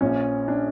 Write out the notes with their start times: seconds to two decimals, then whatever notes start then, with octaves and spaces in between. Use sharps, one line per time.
0.01 A#1 A#2 F3 C#4
0.48 D4